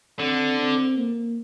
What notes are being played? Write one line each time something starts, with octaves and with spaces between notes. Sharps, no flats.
D3 C4
C4
A#3